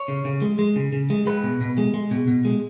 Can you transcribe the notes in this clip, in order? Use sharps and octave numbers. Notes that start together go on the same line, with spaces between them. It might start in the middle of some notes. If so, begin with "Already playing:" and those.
Already playing: C#5
C#3
C#3
G#3
G#3
C#3
C#3
G#3
G#3 B4
B2
B2
G#3
G#3
B2
B2
G#3